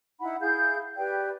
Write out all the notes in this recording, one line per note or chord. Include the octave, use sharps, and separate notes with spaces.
D#4 E4 F#5 B5
E4 G#4 F5 G6
G4 B4 D5 G5